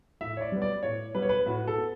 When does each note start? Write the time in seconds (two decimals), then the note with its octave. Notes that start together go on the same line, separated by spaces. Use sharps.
0.21 A2 E5
0.37 C#5
0.41 D5
0.52 G3 B3
0.62 D5
0.83 A2 C#5
1.15 G3 B3 B4
1.22 C#5
1.29 B4
1.46 A2 F#4
1.67 A4
1.77 B3